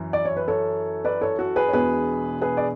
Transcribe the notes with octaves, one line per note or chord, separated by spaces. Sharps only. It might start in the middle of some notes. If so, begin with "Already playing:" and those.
Already playing: F#2 E3
D5
C#5
B4
A4 C#5
B4 D5
A4 C#5
F#4 A4
G#4 B4
C#5
E1 E2 B2 G#4 B4
G#4 B4
D5